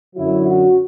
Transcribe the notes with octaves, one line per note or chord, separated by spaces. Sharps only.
F#2 D3 F#3 E4
F#4